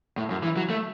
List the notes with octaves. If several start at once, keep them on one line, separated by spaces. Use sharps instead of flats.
A2
F#2
E3
F#3
A3